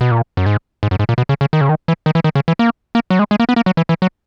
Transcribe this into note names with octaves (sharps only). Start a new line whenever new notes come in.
B2
A#2
F#2
G#2
G#2
F#2
G#2
A#2
B2
C#3
C#3
D#3
C#3
D#3
E3
D#3
E3
D#3
C#3
E3
A#3
A#3
F#3
G#3
G#3
A#3
B3
A#3
F#3
E3
E3
F#3